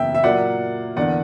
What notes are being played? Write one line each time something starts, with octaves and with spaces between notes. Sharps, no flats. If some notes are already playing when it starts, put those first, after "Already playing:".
Already playing: F#2 C#3 E3 A#3 E5 G5
E5
A#2 F#3 A#3 D5 F#5
E2 D3 A#3 D5 F#5